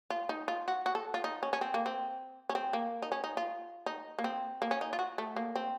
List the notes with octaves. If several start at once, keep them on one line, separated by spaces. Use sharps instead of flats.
F4
D#4
F4
F#4
F#4
A4
F4
D#4
C#4
C#4
C4
A#3
C4
C#4
C4
A#3
D#4
C#4
D#4
F4
D#4
A#3
C4
A#3
C#4
D#4
F4
F#4
A3
A#3
C4